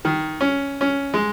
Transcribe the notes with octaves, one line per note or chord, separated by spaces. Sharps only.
D#3
C#4
C#4
G#3